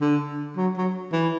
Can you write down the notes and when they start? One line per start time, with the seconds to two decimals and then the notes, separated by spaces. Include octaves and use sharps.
0.01 D3
0.57 F#3
0.77 F#3
1.12 E3